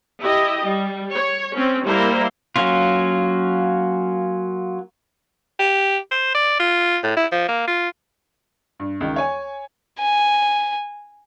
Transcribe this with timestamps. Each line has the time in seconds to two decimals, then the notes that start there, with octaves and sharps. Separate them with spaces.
0.20 E4 G4 D#5
0.65 G3
1.13 C#5
1.56 C4 C#4
1.86 G3 A#3 E4 A#4 C5
2.56 F#3 A#3 C#4 F4
5.60 G4
6.11 C5
6.35 D5
6.60 F4
7.03 A2
7.17 E4
7.32 F3
7.49 A#3
7.68 F4
8.79 G2
9.01 C#2 D#3
9.16 C#5 G#5
9.99 G#5